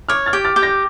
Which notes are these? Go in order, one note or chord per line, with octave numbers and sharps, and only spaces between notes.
C#5 D6 F6
F6 A6
G4
F6 A6
G4
G6 A#6